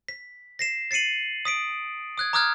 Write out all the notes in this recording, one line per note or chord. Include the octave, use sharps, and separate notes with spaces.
B6
A#6 C7 E7
A6 C7 C#7 D#7 F#7
D#6 B6 D7
D#6 F#6 G#6
A#5 D6 D#6 F6 F#6 G#6